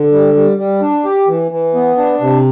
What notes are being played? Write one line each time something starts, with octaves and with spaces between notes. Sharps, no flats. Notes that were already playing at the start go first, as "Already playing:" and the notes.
Already playing: D3
G3
G3
G3
D4
G4
E3
E3
B3
D4
C3